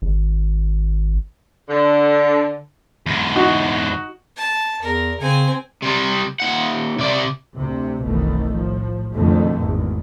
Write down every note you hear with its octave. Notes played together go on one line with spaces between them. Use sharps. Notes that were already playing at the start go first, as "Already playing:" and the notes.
G#1
D3
E2 G#2
D#4 F#4
A5
E2 A#4
C#3 C4 G#5
C3 G3
D#2 F#5
C3 D5
D2 C3
F1 B1 B2 D#3 E3 A3
A2 F3
F2 G#2 B2 D3 D#3 A3
G#1 E2 G#2